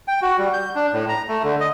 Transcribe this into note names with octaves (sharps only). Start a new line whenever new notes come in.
G5
F#4
G3
G6
D4
A2
A#5
A3
D3
D#5